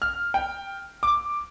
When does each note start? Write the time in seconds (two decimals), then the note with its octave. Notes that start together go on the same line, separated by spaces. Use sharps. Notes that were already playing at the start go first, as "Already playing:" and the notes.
0.02 F6
0.34 G5
1.03 D6